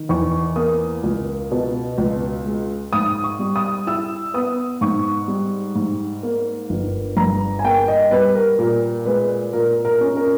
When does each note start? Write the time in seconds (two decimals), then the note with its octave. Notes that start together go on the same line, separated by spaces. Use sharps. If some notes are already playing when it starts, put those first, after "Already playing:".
Already playing: D#3
0.09 E2 C#6
0.56 A#3 D#6
1.03 C#2
1.51 B2
1.98 C#2
2.46 G#3
2.93 G#2 D#6
3.24 C#6
3.39 G3
3.56 D#6
3.87 E4 E6
4.34 B3 D#6
4.81 G#2 C#6
5.28 G3
5.75 G#2
6.23 A#3
6.70 G1
7.17 G2 A#5
7.59 G#5
7.64 A#3 G5
7.88 D#5
8.11 G3 B4
8.35 A#4
8.59 A#2 A#4
9.05 G#3 B4
9.53 A#2 A#4
9.85 A#4
10.01 C#4
10.17 A#4